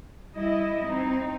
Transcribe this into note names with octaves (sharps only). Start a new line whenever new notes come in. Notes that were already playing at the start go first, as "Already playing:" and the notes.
G3 E4 D#5
C4 D#4